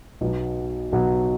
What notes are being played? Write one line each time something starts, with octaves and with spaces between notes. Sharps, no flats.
B1 B2 F#3
B1 B2 F#3